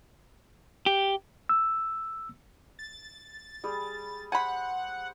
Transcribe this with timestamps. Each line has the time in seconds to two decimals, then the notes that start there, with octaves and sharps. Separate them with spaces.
0.86 G4
1.49 E6
2.79 A6
3.64 G3 G#4
4.32 C5 F#5 G#5 B5